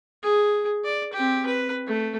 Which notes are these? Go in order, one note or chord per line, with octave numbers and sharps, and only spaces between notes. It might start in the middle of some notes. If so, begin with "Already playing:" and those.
G#4
D5
C4 G4
B4
A3